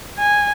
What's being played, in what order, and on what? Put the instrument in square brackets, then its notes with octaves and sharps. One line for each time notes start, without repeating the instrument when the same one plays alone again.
[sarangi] G#5